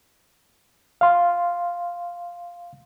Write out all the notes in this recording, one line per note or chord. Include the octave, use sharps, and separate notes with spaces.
F5 C6